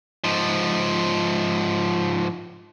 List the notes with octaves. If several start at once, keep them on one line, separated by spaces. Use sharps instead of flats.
G#2 F3